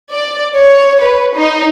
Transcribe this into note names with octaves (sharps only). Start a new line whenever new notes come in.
D5
C#5
B4
D#4